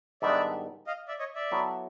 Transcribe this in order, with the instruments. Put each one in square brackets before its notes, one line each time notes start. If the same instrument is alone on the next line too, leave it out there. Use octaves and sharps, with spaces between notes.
[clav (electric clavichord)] G#2 D#3 G3 B3 D4 [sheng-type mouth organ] D5 E5
[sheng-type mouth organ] D#5 F5
D5 E5
C#5 D#5
D5 E5
[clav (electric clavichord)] F#3 B3 E4 A4